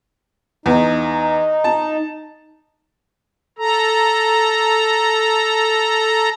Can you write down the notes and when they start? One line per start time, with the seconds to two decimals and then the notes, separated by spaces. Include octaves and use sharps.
0.66 E2 D#4
1.64 A5
3.58 A4 A#5